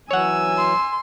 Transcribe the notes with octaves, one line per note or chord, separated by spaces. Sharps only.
E3 F#3 C#5 F#5 G#5 E6
C6